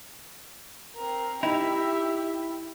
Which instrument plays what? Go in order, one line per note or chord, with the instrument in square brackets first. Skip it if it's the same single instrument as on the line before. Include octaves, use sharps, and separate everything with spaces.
[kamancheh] C4 A#4
[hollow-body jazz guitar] D#4 E4 [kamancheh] G4 E5